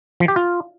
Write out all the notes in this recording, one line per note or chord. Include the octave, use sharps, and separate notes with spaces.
F3
G4
F4